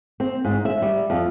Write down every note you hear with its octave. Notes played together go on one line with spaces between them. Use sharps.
C4
G#2
E5
G3
F2